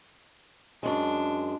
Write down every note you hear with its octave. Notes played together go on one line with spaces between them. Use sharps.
F#2 G#3 D4